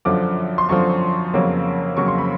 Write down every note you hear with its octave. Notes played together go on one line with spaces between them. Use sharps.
F#2 D3 F3 D6
C6
F#2 D3 F3 C#6
F2 C#3 F#3 A#3
F2 C#3 F#3 A#3 C#6
C6
B5